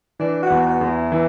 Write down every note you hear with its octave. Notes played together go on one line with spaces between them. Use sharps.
E3 D4
F#4
E2
F#4
E2
E4
E3